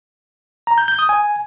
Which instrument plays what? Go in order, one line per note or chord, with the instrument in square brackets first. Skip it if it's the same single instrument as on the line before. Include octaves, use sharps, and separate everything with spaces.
[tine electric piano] A#5
G6
G6
D#6
G#5